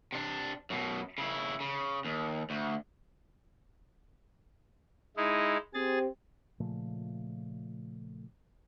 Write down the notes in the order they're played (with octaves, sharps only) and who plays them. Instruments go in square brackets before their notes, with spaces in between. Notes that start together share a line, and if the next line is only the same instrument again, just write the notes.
[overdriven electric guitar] C3 D4
F#2 B2
C#3 E4
C#3
D#2
D2
[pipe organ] G#3 D#4 E4
[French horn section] C4 G4 [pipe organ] G#4 A6
[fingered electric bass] A#2 C#3 F3 A3